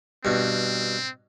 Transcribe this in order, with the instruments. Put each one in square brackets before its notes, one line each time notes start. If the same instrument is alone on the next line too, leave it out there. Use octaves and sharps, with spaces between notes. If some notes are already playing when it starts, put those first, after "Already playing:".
[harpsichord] G2 B2 [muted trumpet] C4